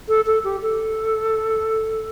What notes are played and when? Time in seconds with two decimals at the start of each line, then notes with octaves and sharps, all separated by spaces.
0.08 A4
0.27 A4
0.44 G4
0.63 A4